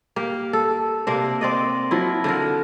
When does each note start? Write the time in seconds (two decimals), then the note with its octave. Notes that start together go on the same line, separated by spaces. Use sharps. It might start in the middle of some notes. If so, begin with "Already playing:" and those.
0.16 A#3 G4
0.53 A4
1.07 C3 A#3 D4
1.41 C4 D5 D#5
1.91 F3 F#3 E4
2.24 D3 F3 A#4